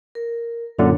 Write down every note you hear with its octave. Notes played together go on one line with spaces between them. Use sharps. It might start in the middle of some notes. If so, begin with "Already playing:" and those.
A#4
F#2 A#2 D3 D4 C#5